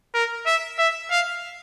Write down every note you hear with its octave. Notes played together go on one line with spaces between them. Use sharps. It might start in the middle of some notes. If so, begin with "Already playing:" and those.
A#4
E5
E5
F5